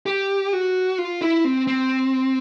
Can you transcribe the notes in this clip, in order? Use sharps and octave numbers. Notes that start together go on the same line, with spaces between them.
G4
F#4
F4
E4
C4
C4